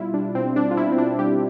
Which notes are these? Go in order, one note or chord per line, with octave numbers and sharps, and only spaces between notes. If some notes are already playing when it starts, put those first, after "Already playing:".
Already playing: B2 G3 E4 F4
G3 D4
B2 C4
G3 D4
F4
B2 E4
C4
B2 D4
G3 G4